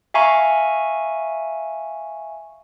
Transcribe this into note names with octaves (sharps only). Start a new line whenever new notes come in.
E5 F5 G#5 A#5 C#6